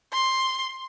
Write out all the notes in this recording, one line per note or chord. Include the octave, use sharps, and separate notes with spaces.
C6